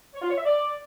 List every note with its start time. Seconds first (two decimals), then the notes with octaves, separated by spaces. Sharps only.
0.14 C#5
0.22 F4
0.29 C#5
0.37 E5
0.45 D5